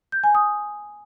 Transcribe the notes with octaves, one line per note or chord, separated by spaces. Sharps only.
G6
G#5
D#6